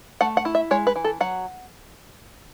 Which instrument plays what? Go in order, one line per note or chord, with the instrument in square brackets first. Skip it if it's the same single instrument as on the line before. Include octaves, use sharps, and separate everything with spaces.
[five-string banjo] A3 F#5
F#5
E4
E5
G#3 C#5
B4
E3
A4
F#3 F#5